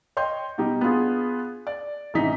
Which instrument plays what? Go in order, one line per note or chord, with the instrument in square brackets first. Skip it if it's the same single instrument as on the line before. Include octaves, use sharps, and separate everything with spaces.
[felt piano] C#5 D#5 G5 C6 G6
B2 G3 D#4 G4
B3 D4 F4 G#4
D5
A1 C3 E3 D#4 B6